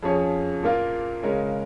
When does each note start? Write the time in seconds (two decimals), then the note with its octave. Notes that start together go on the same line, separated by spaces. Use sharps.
0.03 F2 F3 C#4 G#4 C#5
0.63 A#2 A#3 F4 A#4
1.23 C#3 G#3 C#4 A#4